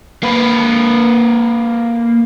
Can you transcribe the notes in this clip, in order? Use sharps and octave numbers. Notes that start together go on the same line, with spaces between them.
A#3 B4